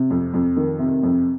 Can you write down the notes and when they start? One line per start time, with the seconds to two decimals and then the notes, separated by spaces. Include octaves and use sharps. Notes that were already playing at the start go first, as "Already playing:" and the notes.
Already playing: C3
0.10 F2
0.34 F2
0.56 D#3
0.79 C3
1.03 F2